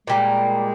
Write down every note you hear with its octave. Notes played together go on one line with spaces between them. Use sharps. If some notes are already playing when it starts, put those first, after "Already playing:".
A#2 G3 G#3 A#3